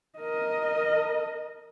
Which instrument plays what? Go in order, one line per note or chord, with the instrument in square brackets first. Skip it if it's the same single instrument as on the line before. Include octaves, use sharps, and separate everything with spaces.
[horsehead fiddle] A#4 D#5